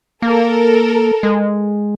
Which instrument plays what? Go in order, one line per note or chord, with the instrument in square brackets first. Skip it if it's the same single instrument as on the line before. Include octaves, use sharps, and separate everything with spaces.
[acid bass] A#3 [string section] A4 A#4
[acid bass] G#3